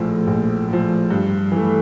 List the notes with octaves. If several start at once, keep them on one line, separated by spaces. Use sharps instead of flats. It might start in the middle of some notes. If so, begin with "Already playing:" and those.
Already playing: A#1 A2 F3
A#1
A2 F3
G2
E3 A3